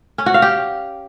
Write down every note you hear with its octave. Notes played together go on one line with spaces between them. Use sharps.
C#4
F#4
F5
G4